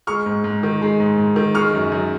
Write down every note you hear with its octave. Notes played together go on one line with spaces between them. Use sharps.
G#3 C#6 F6
G#2
G#2
D#3
G#3
G#2
G#2
D#3
G#3 C#6 F6
F#2
F#2